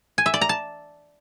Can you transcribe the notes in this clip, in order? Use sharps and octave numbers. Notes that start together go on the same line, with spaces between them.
G#5
E5
D5
A#5
A5